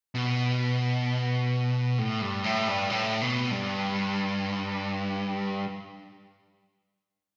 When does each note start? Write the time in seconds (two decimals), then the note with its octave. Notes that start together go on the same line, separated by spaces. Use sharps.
0.15 B2
1.98 A2
2.22 G2
2.44 A2
2.68 G2
2.90 A2
3.21 B2
3.51 G2